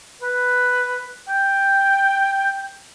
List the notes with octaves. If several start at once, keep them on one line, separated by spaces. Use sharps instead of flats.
B4
G5